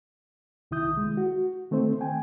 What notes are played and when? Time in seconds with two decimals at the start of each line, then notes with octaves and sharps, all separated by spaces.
0.71 C2 D#3 E4 D#6 G6
0.97 G#3
1.17 F#4
1.71 D#3 A3 C4 C5
2.01 G5 G#5